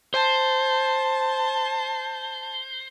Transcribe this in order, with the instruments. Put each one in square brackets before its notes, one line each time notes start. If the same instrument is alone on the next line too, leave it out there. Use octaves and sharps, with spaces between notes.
[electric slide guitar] C5 [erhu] A5